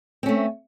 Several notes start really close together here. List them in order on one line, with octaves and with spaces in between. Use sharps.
C4 C#4 A3